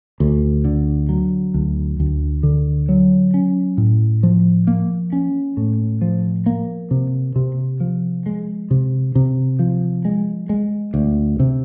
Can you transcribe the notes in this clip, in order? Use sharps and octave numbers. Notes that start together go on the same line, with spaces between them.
D2
D3
F#3
D2
D2
D3
F#3
C#4
A2
F3
A#3
C#4
A2
F3
A#3
C3
C3
F3
G#3
C3
C3
F3
G#3
G#3
D2
C3